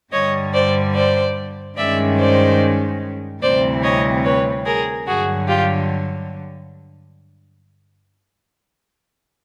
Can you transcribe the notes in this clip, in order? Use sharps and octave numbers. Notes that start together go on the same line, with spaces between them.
G2 D3 G3 C#5 D#5
C5 D5
C5 D5
G2 D#3 G#3 C#4 D5 E5
C5 D5
D2 C3 E3 G3 C4 C5 D5
C#5 D#5
B4 C#5
G#4 A#4
G2 D3 F#3 F#4 G#4
F4 G4